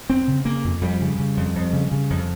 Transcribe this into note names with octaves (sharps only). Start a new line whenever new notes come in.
F2 C4
C#3
C#3 A#3
F2
F2 G3
C#3
C#3
F2
F2
C#3
C#3
F2